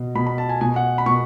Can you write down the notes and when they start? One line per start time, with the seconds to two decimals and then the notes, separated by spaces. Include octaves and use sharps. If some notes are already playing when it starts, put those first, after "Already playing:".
Already playing: B2
0.15 B2 B5
0.27 B5
0.38 A5
0.49 G#5
0.61 B2 G#5
0.76 F#5
0.98 B5
1.06 B2 C#6